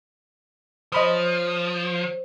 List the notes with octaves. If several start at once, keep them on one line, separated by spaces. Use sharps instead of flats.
F3 C5 C#5 D#5 B5 D#6